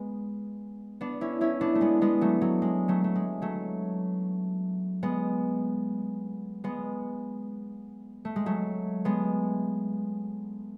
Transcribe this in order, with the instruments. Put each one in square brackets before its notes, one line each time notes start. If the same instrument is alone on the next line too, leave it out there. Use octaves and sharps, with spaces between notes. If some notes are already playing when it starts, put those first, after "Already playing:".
Already playing: [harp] G#3 B3
B3 D4
C#4 E4
C#4 E4
B3 D4
A3
G#3 B3
G#3 B3
F#3 A3
F#3
G#3
F#3 A3
A3
G#3
F#3 A3
G#3 B3
G#3 B3
A3
G#3
F#3 A3
G#3 B3